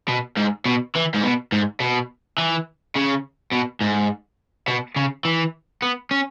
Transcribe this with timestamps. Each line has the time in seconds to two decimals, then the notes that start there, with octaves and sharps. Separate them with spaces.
0.09 B2
0.37 G#2
0.65 B2
0.95 E3
1.14 G#2
1.23 B2
1.52 G#2
1.80 B2
2.38 E3
2.96 C#3
3.53 B2
3.81 G#2
4.68 B2
4.96 C#3
5.25 E3
5.82 B3
6.11 C#4